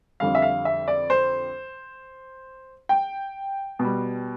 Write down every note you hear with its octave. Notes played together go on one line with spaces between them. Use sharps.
F2 D3 G3 F5
E5
F5
E5
D5
C5
G5
B2
G3